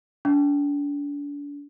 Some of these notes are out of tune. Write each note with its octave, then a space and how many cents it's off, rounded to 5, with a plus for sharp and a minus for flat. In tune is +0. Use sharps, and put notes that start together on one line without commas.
D4 -35